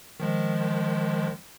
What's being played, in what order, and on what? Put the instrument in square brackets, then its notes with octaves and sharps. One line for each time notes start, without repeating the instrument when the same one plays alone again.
[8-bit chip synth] D#3 F3 G#3